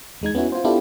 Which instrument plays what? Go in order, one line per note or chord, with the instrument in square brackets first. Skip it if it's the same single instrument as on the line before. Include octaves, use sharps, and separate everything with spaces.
[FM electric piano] E2 G#3 D#4 G#6
B3 C#4 E4 F#4
F4 C5
B3 D4 E4 F4 G4 A4